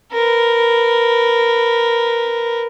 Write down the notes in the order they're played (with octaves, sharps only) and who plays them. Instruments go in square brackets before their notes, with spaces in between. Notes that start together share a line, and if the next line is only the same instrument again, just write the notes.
[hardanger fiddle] A#4 B4